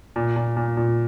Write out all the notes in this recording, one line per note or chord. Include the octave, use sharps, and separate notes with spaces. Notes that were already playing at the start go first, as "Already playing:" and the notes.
A#2
A#2
A#2
A#2